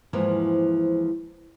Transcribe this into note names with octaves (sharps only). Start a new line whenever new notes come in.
E2 G#2 E3 F3 A#3